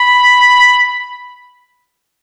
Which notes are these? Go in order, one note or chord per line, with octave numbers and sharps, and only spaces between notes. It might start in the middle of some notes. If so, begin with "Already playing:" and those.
Already playing: B5